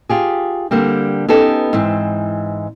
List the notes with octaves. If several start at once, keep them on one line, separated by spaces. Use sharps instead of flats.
F4 G4 G#4
D3 G3 A#3 C4
B3 C#4 D#4 G4 A4
G#2 E3 C4